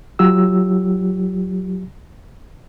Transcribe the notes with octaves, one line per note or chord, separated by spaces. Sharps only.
F#3 F4 G4 E6